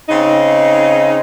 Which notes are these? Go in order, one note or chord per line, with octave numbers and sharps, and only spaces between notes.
C#3 C4 D#4